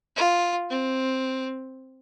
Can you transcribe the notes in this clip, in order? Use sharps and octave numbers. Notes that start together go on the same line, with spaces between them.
F4
C4